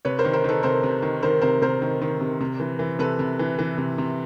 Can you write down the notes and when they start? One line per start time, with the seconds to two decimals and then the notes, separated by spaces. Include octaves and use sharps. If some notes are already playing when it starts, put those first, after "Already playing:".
0.05 C3 B4 C#5
0.19 A#4 C5
0.25 D#3
0.33 A#4 C5
0.44 D#3 A4 B4
0.63 C3 A#4 C5
0.83 C3
1.02 D#3
1.22 D#3 A#4 C5
1.41 C3 A#4 C5
1.62 C3 A#4 C5
1.82 D#3
2.02 D#3
2.21 C3
2.40 C3
2.60 E3
2.79 E3
2.99 C3 A4 B4
3.19 C3
3.39 E3
3.59 E3
3.78 C3
3.98 C3